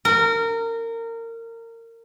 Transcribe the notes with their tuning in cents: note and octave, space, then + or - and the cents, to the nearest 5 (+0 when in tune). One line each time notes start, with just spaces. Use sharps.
A#4 -25